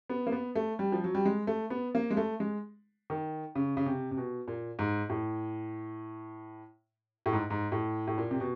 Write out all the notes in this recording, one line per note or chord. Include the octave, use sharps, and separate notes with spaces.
B3
A#3
B3
A3
G3
F3
F#3
G3
G#3
A3
B3
A#3
G#3
A3
G#3
D#3
C#3
C#3
C3
C3
B2
A#2
G#2
A2
A2
G#2
G#2
A2
A2
A#2
C3
B2